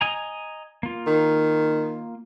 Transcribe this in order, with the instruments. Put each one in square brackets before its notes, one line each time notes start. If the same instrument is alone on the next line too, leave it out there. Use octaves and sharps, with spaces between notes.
[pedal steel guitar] D#5 G#5 A#5
A#3 F4
[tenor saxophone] D#3